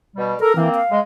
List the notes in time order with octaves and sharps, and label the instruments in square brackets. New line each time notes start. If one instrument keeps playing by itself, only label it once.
[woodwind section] B2 G3
[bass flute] A4 [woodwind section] A#4
[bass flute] E3 [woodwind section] A#3 C4
[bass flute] F5
[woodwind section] G#3